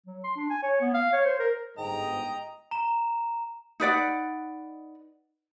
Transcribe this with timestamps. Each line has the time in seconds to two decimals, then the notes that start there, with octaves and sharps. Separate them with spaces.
0.07 F#3
0.24 C6
0.36 D4
0.50 G#5
0.63 C#5
0.81 B3
0.94 F5
1.13 C#5
1.26 C5
1.40 A#4
1.78 G1 G#2 D#5 G5 A#5
2.71 A#5 E7
3.80 D#4 B4 D5 F#5